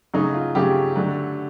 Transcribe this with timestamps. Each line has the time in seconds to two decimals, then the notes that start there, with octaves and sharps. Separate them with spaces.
0.14 C#3 F#3 A3 D#4
0.34 F4
0.55 C#3 F#3 A3 G4
0.96 D3 F#3 A3